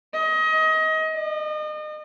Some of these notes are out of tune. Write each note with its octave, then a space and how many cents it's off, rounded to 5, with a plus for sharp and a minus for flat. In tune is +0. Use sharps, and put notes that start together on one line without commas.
D#5 +25
D#5 -35